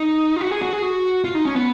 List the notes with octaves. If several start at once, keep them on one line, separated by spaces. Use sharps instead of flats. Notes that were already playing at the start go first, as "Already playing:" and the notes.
Already playing: D#4
F4
F#4
G#4
F#4
G#4
F#4
F4
D#4
C#4
B3